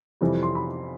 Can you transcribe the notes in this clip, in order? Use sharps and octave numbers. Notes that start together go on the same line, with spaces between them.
F2 C3 E3 G3
C6
B5